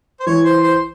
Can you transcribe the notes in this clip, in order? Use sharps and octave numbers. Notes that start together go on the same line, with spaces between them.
C5
E3 C#5
C5
C5